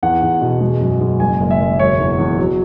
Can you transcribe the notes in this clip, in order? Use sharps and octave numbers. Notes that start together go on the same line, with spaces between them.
E2 F#5
E2
B2
G#3
F#2
G#3
F#1 G#5
F#1
E5
F#1
E1 C#5
E2
E2
F#3